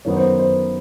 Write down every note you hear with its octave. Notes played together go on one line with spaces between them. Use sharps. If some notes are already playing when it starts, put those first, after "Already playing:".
F#2 D#3 F#3 B3 C#5
C5
C5